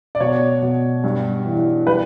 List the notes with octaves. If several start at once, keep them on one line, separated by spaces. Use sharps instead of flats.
D5
B2 C#5
B2
G2
E3
G3 B4